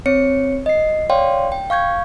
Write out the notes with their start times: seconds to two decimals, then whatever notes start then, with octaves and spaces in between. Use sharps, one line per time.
0.06 C4 C#5 C#7
0.66 D#5 C7
1.10 C#5 D5 F5 G5 C6
1.52 G5
1.70 F5 C#6 G6 G#6